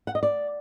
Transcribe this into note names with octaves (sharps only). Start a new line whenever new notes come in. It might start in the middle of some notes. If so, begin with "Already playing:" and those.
F#5
D#5
D5